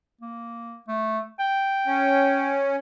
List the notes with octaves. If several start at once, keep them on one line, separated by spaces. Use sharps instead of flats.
A#3
A3
G5
C#4